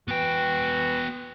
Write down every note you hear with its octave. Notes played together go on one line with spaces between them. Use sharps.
E3 B3 F#4 G5